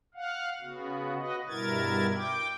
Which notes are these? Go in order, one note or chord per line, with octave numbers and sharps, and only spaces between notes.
F5 F#5
C#3 B3 F#4
F#4 B4 D#5
G2 B2 E4 A#4 G#6 A6
G5 D6